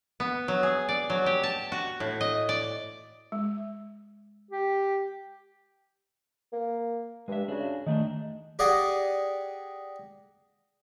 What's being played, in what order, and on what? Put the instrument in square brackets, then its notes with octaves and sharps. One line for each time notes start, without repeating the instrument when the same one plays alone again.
[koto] B3
F#3
G#4
D5
F#3
G4
A5
F#4
A2
D#5
D5
[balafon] G#3
[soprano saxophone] G4
[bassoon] A#3
[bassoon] G2 [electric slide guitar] G#3 E5
[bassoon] C#3 [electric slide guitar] D4 F#4
[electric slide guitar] D#3 A3 D4 [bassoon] D#4
[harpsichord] G4 G#4 D5 D#5 F#5 G#5